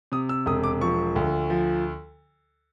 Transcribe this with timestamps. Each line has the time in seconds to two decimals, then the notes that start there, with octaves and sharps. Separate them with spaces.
0.12 C3 D#6
0.29 E6
0.46 E1 D#6
0.64 D6
0.81 F3 C#6
1.16 D2
1.50 F3